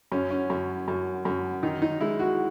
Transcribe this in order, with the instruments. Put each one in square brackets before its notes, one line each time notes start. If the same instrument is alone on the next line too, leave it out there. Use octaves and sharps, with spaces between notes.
[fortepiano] F#2 C#4
C#4
F#2
F#2
F#2
D#3 D#4
D#4
G#3 E4
F#4